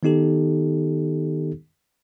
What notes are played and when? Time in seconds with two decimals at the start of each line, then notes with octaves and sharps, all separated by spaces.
0.03 D#3 B3 D#4 G4 A4